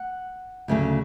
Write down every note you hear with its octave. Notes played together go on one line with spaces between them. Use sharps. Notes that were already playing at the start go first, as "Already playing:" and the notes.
Already playing: F#5
D2 C#3 F#3 A3